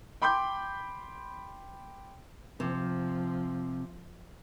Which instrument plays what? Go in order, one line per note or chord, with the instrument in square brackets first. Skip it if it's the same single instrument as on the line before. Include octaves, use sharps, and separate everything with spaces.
[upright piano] G5 B5 C6 D6 G6
[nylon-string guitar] C3 [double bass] F3